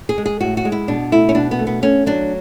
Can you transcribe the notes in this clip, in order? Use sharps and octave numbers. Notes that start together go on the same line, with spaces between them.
G#4
G#3
G#4
A2 F#4
F#4
G#3
E4
B2 D4
A3 E4
C#4
B2 D4
B3
A3
B3
A3 C#4
F#3 D4